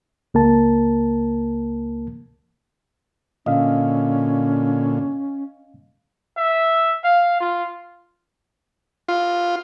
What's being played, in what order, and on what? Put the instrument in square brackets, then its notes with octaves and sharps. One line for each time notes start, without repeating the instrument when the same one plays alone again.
[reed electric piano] C#2 A#3 A#4 A5
[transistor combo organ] A#2 D3 [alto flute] C#4 [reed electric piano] D#5 F5
[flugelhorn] E5
F5
F4
[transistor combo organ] F4